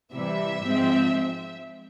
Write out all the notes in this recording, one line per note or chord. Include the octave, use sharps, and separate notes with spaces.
C3 E3 G3 E5
G#2 F3 G#3 C4